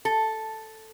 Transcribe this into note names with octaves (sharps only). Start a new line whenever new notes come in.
A4